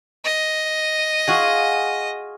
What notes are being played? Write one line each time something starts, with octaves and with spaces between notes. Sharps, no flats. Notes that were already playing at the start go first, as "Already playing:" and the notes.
D#5
F4 F#4 G#4